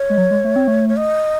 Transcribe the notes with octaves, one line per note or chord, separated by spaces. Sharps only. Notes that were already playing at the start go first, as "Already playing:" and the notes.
Already playing: C#5
G#3
F#3
G#3
A3
C4
A3
C#5
D#5